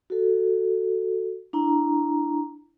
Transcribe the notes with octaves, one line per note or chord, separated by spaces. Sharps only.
F#4 A4
D4 E4 A#5